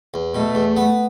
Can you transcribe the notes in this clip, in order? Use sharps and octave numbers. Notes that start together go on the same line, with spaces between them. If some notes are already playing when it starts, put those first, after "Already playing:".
E2
B2 A3
E2
B3